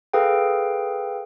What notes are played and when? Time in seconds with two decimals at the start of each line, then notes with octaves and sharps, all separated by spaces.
0.13 G#4 A4 B4 F5 G5